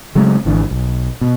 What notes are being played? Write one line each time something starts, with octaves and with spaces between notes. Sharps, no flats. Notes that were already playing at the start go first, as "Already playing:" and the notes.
C#3 F#3 G#3 A3
G#1 D3 E3 D4
B1
B2